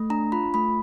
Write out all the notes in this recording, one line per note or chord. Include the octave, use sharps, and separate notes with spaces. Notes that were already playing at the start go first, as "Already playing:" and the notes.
Already playing: A3
D4 A#5
F4 B5
A3 B5